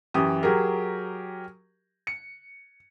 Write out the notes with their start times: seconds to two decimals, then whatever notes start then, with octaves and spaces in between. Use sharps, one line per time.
0.14 F#2 E3 G4 D#6
0.43 F#3 G4 G#4 A#4
2.07 C#7